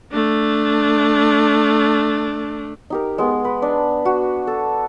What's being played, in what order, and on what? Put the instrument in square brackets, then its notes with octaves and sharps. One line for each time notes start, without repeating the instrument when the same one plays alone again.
[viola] A3 D4
[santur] D#4 G4 A#4
G#3 B3
B4
D4
F#4
A4